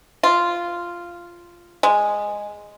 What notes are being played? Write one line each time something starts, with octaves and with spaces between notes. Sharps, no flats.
F4
G#3